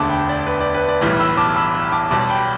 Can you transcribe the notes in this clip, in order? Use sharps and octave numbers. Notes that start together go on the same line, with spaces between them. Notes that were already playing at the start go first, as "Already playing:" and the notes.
Already playing: E1 D2 D3 A5 D6
G5 B5
D5
B4
D5
B4
D5
B1 A2 E3 G3
B5 E6
A5 D6
B5 E6
B5 E6
A5 D6
B1 B2 G3 A5 D6
G5 B5